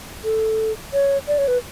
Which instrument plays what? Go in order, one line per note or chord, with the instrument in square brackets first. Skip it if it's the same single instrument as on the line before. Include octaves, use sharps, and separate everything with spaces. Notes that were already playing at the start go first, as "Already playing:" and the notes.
[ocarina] A4
C#5
D5
C#5
B4